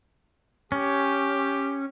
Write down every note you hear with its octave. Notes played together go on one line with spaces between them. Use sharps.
C#4 G4